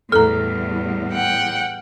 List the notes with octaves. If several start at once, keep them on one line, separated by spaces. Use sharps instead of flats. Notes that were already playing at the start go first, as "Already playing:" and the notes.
E2 A2 G3 A4 A#5 F6
F#5 G5